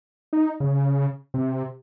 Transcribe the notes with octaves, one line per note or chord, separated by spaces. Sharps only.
D#4
C#3
C3